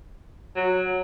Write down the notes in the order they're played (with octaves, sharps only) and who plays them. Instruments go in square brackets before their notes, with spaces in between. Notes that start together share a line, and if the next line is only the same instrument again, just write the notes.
[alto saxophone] F#3